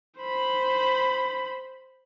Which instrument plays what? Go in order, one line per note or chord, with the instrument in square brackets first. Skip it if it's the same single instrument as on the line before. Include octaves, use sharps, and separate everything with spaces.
[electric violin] C5 B5